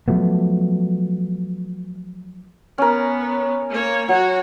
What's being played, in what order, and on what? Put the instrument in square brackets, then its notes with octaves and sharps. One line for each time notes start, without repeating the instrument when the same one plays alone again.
[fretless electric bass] F3 F#3 A3 B3
[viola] B3 [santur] C#4 A#4
[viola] A#3 C#5
[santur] F#3 [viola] F#4 C#5